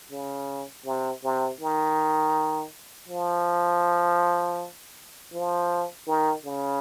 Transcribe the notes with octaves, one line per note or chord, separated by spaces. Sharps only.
C#3
C3
C3
D#3
F3
F3
D#3
C#3